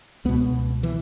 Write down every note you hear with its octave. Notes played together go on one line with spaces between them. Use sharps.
C#2 B2 B3
E3